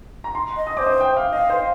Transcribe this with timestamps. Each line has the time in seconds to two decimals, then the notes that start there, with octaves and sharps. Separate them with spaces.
0.24 A#5
0.35 C6
0.57 D#5
0.67 D#6
0.77 C5 D6
0.87 D#6
1.01 G5
1.17 F5
1.33 D#5 F5
1.50 C5